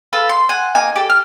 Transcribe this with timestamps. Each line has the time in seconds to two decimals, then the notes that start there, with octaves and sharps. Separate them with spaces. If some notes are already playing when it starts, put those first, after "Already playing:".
0.13 F4 A4 B4
0.29 C6
0.49 F#5 G#5
0.75 A#3 D#4 G#5
0.96 G4 A4
1.10 F6